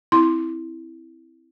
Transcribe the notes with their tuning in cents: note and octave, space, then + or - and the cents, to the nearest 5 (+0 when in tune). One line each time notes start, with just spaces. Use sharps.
C4 +0 E4 -5 C6 +0